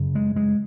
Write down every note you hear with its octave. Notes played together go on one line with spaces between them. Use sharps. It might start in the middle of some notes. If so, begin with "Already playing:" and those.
Already playing: F#2 C#3
G#3
G#3